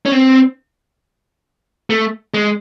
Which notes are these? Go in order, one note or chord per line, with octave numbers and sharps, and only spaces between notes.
C#4
C4
A3
G#3